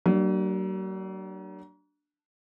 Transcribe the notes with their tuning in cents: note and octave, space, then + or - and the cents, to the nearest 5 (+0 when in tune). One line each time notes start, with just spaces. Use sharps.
F#3 +40 A#3 -20 D4 +10